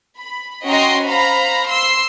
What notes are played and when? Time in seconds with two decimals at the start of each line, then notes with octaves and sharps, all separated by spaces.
0.19 B5
0.65 C#4 F#4 D#5 G5 A#5 C6
1.06 C5 F5 A#5 B5
1.66 C6 E6